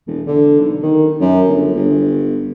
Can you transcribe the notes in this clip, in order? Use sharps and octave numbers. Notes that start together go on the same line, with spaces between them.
E1
D3
B1
D#3
F#2
G1
G1